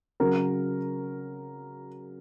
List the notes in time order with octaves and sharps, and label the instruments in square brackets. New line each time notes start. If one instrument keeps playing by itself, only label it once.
[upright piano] C#3 F#3 A#4